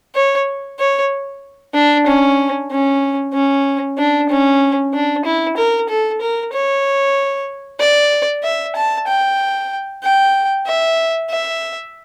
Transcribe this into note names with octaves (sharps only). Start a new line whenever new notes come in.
C#5
C#5
D4
C#4
C#4
C#4
D4
C#4
D4
E4
A#4
A4
A#4
C#5
D5
E5
A5
G5
G5
E5
E5